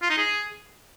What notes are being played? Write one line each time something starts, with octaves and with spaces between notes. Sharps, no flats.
F4
D#4
G#4